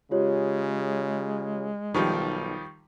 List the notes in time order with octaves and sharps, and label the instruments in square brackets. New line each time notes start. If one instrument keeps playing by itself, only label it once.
[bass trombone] C#3 [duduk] G#3 [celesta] F4 G4 C#5
[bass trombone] B1 [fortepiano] D#3 F3 G3 [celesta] C#6